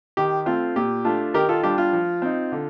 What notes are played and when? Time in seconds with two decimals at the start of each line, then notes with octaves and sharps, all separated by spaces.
0.17 D#3 G4
0.46 A3 C4 F4
0.76 A#2 G4
1.05 A3 D4 F4
1.34 D#3 G4 A#4
1.49 F4 A4
1.63 G3 D4 F4 G4
1.78 F4
1.93 F3
2.22 C4 D#4
2.52 D3